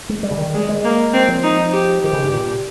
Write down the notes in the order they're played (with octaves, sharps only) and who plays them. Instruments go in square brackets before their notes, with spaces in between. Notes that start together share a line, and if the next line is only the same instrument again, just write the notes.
[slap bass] G#3
G3
C#3
D#3
[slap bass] G3 [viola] G#3
[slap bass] G#3
[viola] A#3
C4
[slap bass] F3
[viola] D#4
G4
[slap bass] D#3 [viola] G4
[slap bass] C#3
G2
A#2